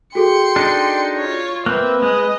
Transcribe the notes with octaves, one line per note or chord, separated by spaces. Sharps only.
F#4 G#4 A4 G5 C6 C#7
D4 D#4
F4 C#5
A#3 C4 B4 E5 F#6
G#3 D#5